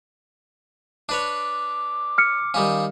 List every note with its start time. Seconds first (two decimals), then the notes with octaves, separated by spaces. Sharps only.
1.09 D4 B4 C#5 D6
2.18 F6 C#7
2.54 D#3 G3 C#4 F5